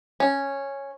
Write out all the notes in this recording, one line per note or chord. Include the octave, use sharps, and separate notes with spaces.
C#4